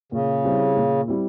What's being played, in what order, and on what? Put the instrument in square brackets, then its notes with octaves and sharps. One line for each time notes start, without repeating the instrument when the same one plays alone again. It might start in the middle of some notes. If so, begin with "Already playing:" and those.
[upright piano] A#2 [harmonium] C#3
[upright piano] G3 C4 E4
A#2
G3 C4 E4